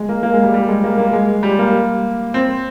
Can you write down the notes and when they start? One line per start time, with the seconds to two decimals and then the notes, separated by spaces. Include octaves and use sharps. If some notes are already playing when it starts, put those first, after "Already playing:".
Already playing: G#3
0.09 A#3
0.23 A#3
0.33 G#3
0.43 G3
0.54 G3
0.68 G#3
0.84 A#3
0.98 A#3
1.13 G#3
1.43 G3
1.59 A#3
2.34 C4